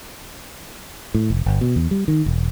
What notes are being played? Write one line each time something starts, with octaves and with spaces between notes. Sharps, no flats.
A2
F1
G1
B2
E2
G3
D#3
E1